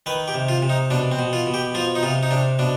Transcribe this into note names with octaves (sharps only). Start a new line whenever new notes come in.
D#3 B4
G4
C3
F4
C3
D#4
B2 D4
C4
B2
F4
B2
G4
F3 F4
D#4
C3 F4
D#4
C3 D4
B2 D4